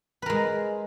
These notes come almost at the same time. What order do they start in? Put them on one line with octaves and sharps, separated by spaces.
B4 A#4 G#3